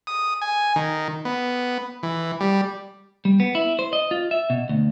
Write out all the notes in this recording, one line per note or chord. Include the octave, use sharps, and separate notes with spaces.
D#6
G#5
D#3
B3
E3
G3
G3
B3
E4
C5
D#5
F4
E5
B2
D2